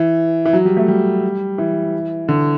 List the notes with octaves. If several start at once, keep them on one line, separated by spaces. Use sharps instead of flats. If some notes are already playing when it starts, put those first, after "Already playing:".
Already playing: E3
E3
F#3
G3
A3
G3
E3
D3